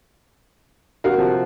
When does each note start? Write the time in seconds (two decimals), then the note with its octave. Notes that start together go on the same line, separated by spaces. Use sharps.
1.04 D3 F#4 A#4 F5
1.18 C3 F3